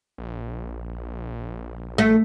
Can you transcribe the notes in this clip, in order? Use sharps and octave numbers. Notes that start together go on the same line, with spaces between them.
A#1
A3